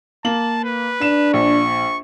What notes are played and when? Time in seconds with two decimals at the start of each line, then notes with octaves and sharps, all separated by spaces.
0.25 A#3 A5 F#7
0.64 B4
1.01 D4 E7
1.33 A#1 C#6